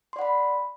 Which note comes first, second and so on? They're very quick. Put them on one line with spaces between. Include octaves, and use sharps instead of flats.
C6 D5 F#5 B5